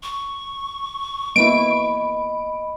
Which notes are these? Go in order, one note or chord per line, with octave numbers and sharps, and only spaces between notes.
C#6
A#3 B3 E4 D#5 B5 D7